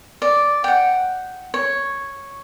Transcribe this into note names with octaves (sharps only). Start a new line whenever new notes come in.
D5
F#5 G5
C#5